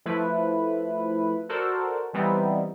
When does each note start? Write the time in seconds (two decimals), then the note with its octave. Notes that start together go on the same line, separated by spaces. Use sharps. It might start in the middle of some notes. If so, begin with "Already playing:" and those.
0.06 F3 A3 E4 B4
1.49 F#4 A4 A#4 C5 D5
2.14 E3 G3 B3 C4 D#4 E4